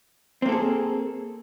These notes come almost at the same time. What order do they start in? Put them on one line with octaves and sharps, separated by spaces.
C4 A#3 A4 G#4